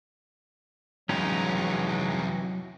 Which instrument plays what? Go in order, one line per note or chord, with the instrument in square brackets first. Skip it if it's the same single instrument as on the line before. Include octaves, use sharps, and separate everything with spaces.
[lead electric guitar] C2 F2 [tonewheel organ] E3 F#4 [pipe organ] F#3 [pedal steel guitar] G#3 C#4 D#4